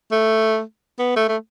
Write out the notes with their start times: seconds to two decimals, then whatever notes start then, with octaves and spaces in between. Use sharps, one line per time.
0.12 A3
0.99 B3
1.16 A3
1.29 A3